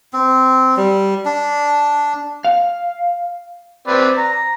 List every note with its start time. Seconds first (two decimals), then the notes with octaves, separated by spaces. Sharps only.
0.13 C4
0.77 G3
1.25 D4
2.45 F5
3.88 C4 B4 D5
4.18 A#5